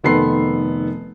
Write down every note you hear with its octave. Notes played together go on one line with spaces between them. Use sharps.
F1 D#3 B3 A4 C6 C7